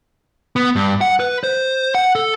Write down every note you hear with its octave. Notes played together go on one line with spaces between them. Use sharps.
B3
G2
F#5
B4
C5
F#5
A4